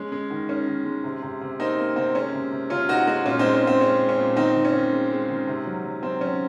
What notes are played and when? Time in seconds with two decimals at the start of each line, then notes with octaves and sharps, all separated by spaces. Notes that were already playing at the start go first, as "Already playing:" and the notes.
Already playing: G#3 C#4
0.12 G#3
0.30 D#3
0.49 D#3 C#4
0.67 D#3
0.85 G#3
1.04 C3
1.23 C3
1.41 C3
1.60 A#3 C4 D#4
1.78 A#3
1.96 C3 C4
2.15 G#3 C#4
2.34 C3
2.52 C3
2.70 C3 C#4 F4
2.89 C3 D#4 F#4
3.07 G#3 D#4 F#4
3.25 A#2 C#4 F4
3.39 C4 D#4
3.44 G#3
3.53 C#4
3.63 G#3 C4
3.81 G#3 C#4
4.00 G#3
4.09 C#4
4.18 A#2
4.36 D#3 C4 D#4
4.55 D#3
4.65 C#4
4.74 D#3
4.92 G#3
5.10 G#3
5.29 D#3
5.47 C3
5.66 F#3
5.85 F#3
6.03 F#3 C4
6.21 F#3 C#4